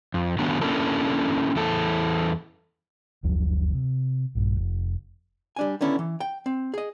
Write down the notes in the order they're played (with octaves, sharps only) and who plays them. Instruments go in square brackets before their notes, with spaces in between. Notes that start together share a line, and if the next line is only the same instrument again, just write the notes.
[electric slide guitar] F2
D#3 F#3 A3 B3 D4
A#3 C#4 D4 E4 A4 A#4
E2 E4 A4
[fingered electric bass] F#1 D2 F3 F#3
C3
A#1 G2
F1
[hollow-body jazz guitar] G3 D4 G#5
D3 D#3 B3 C#4 E4 A4
E3
G5
C4
G#4 D#5